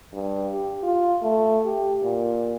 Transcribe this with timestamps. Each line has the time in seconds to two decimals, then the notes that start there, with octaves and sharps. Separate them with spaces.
0.14 G2
0.54 G4
0.83 F4
1.22 A3
1.65 G4
2.02 A#2